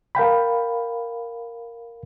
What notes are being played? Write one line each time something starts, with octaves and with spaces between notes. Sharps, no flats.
A#4 F5 G5 B5